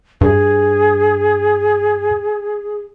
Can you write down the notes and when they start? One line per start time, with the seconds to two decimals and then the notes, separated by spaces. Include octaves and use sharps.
0.21 G2 G#4